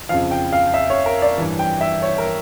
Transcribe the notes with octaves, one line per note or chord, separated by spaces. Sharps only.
F2 C#3 F3 F5
G5
F5
E5
C#5
A#4
D5
G2 E3
G5
E5
C#5
A#4